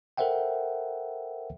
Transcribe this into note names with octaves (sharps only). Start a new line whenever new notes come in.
A4 A#4 C5 E5 F#5 G5